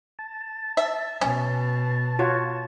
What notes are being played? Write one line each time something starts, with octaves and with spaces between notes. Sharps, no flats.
A5
E5
B2 C#4
F4 F#4 C#5